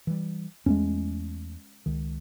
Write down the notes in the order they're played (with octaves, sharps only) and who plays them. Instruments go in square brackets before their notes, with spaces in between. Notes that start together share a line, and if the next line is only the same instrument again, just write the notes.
[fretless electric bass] E3 G3
[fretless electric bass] E2 A3 [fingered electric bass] G#3 B3 C#4
[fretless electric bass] C#2 D#3